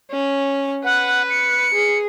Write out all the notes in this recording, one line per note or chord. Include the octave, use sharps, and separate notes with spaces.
C#4
B4 F#5
C#7
G#4